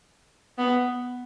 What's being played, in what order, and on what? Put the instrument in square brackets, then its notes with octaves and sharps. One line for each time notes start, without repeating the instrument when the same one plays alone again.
[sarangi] B3